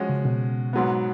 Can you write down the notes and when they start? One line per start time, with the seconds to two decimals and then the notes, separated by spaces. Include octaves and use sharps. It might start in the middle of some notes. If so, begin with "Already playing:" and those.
Already playing: F3 G#3 C#4 F#4
0.09 C#3
0.25 B2
0.73 G#2 F#3 B3